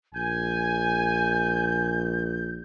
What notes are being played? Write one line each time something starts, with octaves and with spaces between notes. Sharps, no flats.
A#1 G#5 G6